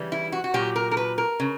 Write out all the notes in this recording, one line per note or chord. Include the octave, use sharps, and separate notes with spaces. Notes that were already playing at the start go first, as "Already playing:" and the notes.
Already playing: C#3 E3 G3
E4
F#4
F#4
A#2 F#3 G4
A#4
A#4
B4
A#4
C#3